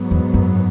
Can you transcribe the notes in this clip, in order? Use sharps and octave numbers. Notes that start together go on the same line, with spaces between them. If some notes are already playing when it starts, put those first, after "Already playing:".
Already playing: G#2 F#3 B3
E2
F#2